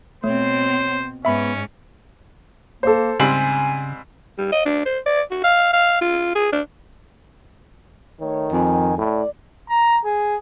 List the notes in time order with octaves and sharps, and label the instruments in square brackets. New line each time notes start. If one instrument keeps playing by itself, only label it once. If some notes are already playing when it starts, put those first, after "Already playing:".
[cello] B2 C4 [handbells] A3 [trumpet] C5 [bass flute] C#5
[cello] G#2 [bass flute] B3 [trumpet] C#4 [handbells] E5 B5
[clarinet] A#3 [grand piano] A4 C5
[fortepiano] G#2 G3 C4 [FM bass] C#3 [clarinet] G#5 [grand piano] F#7
[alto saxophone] G3
D#5
D4
C5
D5
F#4
F5
F5
F4
G#4
D4
[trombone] D#3 [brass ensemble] A3 C#5
[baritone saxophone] F2 [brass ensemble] G#5
[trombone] A2 [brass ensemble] D5
[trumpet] A#5
G#4